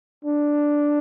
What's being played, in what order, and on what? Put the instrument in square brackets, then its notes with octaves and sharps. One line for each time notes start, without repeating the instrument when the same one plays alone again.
[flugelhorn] D4